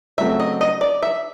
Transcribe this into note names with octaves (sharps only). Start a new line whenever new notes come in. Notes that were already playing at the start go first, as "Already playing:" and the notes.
C#3 F#3 A3 C4 E5
D#5
D#5
D5
E5